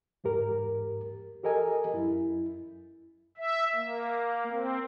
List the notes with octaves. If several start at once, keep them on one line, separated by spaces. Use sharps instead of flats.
E2 G#2 G4 A#4
G4 A4 A#4 D#5 G#5
F#2 E4
E5
A#3
C4